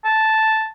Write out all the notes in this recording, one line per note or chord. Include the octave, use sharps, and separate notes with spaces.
A5